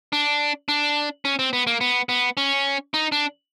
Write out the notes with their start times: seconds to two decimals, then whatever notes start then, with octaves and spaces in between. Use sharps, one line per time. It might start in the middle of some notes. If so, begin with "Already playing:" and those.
0.13 D4
0.69 D4
1.25 C#4
1.39 C4
1.53 B3
1.67 A#3
1.81 B3
2.09 B3
2.37 C#4
2.94 D#4
3.12 D4